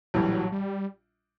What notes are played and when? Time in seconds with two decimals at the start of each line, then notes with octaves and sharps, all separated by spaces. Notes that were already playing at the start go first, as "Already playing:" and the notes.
0.14 A#1 A2 E3 F#3 G3
0.52 G3